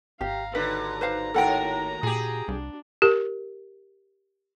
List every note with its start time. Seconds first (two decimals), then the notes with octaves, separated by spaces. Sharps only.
0.21 G#1 G4 F5 A#5
0.55 D#2 D3 F#4 B4 A#5
1.01 B4 C5 F5
1.34 D#2 A2 A4 A#4 F#5 G5
2.03 A#2 G4 G#4
2.48 C2 D4 F#4
3.02 G4 A#4